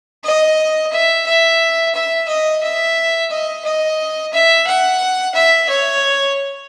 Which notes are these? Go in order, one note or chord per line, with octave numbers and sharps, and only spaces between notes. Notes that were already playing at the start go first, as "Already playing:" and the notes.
D#5
E5
E5
E5
D#5
E5
D#5
D#5
E5
F#5
E5
C#5